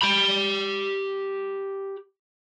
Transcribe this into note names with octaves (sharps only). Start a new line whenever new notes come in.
G4 B5